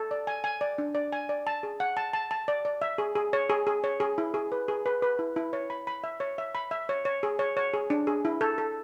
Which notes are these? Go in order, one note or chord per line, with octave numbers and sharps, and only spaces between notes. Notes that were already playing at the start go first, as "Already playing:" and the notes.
Already playing: A4
D5
G#5
G#5
D5
D4
D5
G#5
D5
A5
G#4
F#5
A5
A5
A5
D5
D5
E5
G#4
G#4
C#5
G#4
G#4
C#5
G#4
E4
G#4
B4
G#4
B4
B4
E4
E4
C#5
B5
B5
E5
C#5
E5
B5
E5
C#5
C#5
G#4
C#5
C#5
G#4
D4
G#4
E4
A4
A4